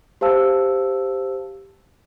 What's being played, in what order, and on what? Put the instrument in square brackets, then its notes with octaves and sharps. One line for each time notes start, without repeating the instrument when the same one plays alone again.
[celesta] G4 C5 F5 A5 E6